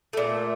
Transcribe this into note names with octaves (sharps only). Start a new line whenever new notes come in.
A#2 A3